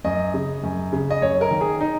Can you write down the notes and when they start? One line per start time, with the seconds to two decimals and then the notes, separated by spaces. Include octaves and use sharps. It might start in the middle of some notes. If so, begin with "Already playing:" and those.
0.04 F#2 D#5
0.34 C#3
0.63 F#2
0.93 C#3
1.11 D#5
1.22 F#2 C#5
1.41 A#4
1.51 D#3
1.61 G#4
1.81 D#4